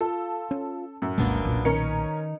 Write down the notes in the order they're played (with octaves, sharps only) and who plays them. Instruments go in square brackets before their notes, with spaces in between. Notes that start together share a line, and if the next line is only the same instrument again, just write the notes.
[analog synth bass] F4 [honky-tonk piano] A4
[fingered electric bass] C#4
[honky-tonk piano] F#2 [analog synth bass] A2
[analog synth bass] F1 [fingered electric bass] C2 A#2 G#3 [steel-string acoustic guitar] A#3 B3 D4
[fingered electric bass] B1 A#2
[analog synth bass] D#3 [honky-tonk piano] C#4 A#4 C#7 [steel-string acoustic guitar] D#4